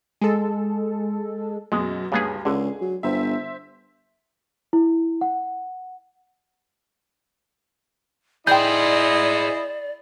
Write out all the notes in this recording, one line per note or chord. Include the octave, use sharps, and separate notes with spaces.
G#3 A4
F#2 B2 F#3 G#3
D2 G2 C#3 B3 G#4
C#2 D3 G#4
F#3
G1 C5 E5
E4
F#5
E4 G#4 C5 D5 D#5 G5 G6